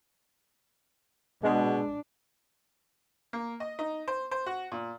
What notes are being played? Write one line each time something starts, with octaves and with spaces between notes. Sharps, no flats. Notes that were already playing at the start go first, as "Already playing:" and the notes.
B2 G#3 D4
A#3
D#5
D#4
C5
C5
F#4
A#2